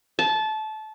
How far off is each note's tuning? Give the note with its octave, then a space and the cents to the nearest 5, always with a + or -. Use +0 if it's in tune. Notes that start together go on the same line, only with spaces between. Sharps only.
A5 -20